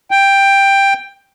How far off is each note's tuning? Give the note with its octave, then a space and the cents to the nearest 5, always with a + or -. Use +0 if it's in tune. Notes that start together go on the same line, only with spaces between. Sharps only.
G5 +10